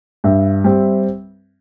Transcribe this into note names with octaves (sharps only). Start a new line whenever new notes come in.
G2 E5
G3 C4